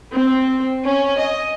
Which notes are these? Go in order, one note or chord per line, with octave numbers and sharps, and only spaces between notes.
C4
C#4
D#5